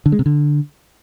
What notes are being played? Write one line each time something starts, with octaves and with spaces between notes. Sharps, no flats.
D3
G#3
C3
D3